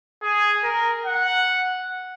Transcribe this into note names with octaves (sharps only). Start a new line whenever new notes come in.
G#4
A#4
F#5